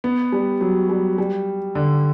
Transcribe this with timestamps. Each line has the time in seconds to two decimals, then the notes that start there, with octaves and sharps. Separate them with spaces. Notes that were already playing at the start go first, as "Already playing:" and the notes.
0.04 B3
0.32 G3
0.61 F#3
0.89 G3
1.18 G3
1.75 D3